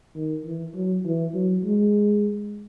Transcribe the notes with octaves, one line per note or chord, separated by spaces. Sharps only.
D#3
E3
F#3
E3
F#3
G#3